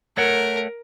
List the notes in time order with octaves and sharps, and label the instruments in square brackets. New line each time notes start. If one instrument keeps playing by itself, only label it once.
[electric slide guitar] A3 C#5 F#5 [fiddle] A#4